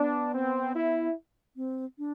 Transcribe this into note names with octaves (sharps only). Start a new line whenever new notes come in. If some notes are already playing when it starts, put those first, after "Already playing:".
Already playing: B3 D4
C4
E4
C4
D4